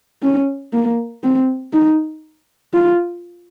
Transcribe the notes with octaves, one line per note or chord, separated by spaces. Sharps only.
C#4
A#3
C4
D#4
F4